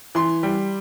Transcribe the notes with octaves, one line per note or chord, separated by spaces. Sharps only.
E3 C6
G3